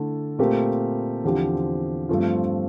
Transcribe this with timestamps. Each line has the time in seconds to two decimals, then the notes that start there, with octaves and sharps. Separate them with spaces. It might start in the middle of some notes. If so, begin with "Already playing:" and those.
Already playing: D3 A3 E4 A4
0.39 A#2 A3 C4 G4 A#4
1.24 E2 D3 F3 C4 G4
2.09 G2 F3 A3 C4 F4